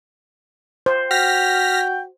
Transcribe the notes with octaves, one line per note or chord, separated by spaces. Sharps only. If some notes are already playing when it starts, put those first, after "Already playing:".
C5
F#4 G5 F6 A#6 B6